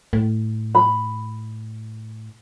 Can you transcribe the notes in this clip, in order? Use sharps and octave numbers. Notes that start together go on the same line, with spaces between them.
A2
B5